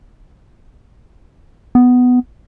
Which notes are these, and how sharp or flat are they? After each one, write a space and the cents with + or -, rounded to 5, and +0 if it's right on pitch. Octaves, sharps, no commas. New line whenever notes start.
B3 +10